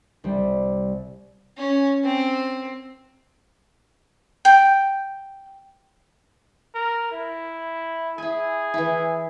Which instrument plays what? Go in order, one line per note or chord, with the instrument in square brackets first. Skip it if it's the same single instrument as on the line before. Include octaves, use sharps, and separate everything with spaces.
[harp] C2 G3
[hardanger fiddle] C#4
C4
[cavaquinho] G5
[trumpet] A#4
E4
[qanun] E4 G#5 [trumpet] G#4
[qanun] E3 E4